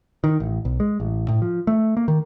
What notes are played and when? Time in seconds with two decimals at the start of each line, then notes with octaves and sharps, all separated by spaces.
0.24 D#3
0.40 A1
0.65 B1
0.80 G#3
1.00 A1
1.28 A2
1.42 F3
1.67 A3
1.97 A#3
2.08 D#3